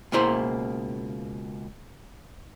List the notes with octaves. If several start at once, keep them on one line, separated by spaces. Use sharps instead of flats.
C#2 B2 A#3 E4 C5 A#5